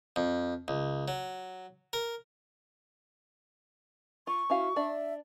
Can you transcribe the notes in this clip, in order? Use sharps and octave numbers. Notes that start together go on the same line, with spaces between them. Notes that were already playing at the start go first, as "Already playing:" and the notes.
F2
C#2
F#3
A#4
F4 C#6
C#4 E4 F#4 F5
D4 D5 E5